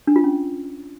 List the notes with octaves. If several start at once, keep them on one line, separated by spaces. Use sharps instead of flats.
D4
F4
C#4